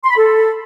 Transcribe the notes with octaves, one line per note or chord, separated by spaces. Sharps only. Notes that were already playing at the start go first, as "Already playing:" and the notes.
C6
B5
A4